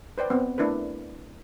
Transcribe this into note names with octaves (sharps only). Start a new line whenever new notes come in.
B4 C5 D5 G5
B3 C4
A3 D4 E4 A#4 B4